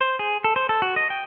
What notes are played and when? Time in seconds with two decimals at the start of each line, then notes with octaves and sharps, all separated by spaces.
0.01 C5
0.19 G#4
0.44 A4
0.56 C5
0.69 A4
0.82 F#4
0.96 D#5
1.10 G5